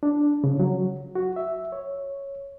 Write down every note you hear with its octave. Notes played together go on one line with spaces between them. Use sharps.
D4
C#3
F#3
F#4
E5
C#5